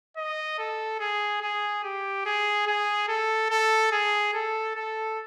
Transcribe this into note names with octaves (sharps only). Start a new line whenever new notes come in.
D#5
A4
G#4
G#4
G4
G#4
G#4
A4
A4
G#4
A4
A4